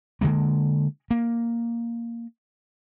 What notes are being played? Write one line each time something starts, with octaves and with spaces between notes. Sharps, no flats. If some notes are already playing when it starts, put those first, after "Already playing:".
D3 F3 G#3 A#3
A#3